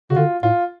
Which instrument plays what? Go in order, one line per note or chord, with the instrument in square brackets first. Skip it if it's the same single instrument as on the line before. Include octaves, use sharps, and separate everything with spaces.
[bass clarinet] C#3 [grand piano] F#4
[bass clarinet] D3 [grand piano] F4
[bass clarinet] A2 [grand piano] F4